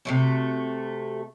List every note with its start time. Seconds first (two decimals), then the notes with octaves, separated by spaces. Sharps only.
0.05 C3 A3 F#4